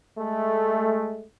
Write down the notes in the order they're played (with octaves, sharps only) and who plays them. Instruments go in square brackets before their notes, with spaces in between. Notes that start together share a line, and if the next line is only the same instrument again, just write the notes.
[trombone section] G#3 A3